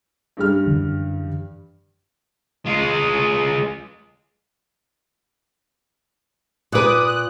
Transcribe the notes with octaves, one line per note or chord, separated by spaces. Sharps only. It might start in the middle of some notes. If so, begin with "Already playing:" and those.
G2 G3 F6
F#2 D3 E3
G#3 F4
A#2 B4 D6 D#6 F#6
F#6